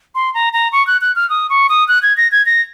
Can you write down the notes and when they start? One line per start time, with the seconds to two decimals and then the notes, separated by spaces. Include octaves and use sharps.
0.15 C6
0.34 A#5
0.53 A#5
0.72 C#6
0.87 F#6
1.01 F#6
1.16 F6
1.30 D#6
1.50 C#6
1.69 D#6
1.88 F#6
2.03 G#6
2.17 A#6
2.32 G#6
2.46 A#6